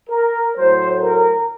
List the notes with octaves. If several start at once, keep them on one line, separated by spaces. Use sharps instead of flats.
A#4
A2 F#3 A3 C5
A#4